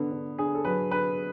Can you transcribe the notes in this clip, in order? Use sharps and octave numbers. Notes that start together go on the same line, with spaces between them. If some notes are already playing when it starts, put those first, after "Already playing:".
Already playing: D3 B3
D3
D3 G#4
A4
F#3 B4
D3 B4